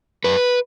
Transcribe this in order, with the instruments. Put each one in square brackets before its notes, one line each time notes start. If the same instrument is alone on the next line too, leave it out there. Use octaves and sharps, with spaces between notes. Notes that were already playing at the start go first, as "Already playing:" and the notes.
[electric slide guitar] F#2 B4